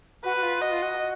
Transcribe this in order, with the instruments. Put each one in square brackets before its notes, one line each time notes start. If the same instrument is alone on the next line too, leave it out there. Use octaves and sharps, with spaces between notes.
[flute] F#4 [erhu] B4
[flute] F#4
F4
[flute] F#4 [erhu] D#5
[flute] F4
F#4